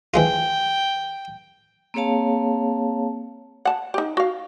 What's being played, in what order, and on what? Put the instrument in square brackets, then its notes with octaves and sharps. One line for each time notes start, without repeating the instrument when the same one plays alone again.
[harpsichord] E3 G#3 F4 [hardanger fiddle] G5
[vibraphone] A#3 C4 G#4 C#5 F5 A5
[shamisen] F#5 A5
D#4 G4
F#4 F5